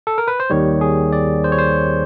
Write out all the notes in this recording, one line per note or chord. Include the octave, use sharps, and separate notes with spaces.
A4
A#4
B4
C5
D#2 D#3 G3 C#5
G#4
D5
C5
C#5
C5